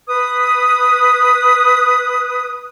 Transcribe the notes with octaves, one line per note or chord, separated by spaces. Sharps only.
B4 D#6